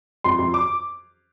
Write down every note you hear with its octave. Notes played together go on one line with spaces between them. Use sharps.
F2 C6
F2
D6